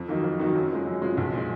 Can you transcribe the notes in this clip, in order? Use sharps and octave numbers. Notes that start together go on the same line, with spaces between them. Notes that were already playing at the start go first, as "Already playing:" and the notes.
Already playing: F2
D#3 F#3 A#3 D#4
F2
D#3 F#3 A#3 D#4
F#2
F3 G#3
F#2
F3 G#3
B1
A#2 F3 G#3